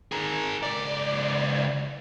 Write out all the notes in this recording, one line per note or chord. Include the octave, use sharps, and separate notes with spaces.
G#4 A#4
C#2 D5